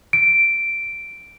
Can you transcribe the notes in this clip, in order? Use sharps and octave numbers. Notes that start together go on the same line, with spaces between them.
D7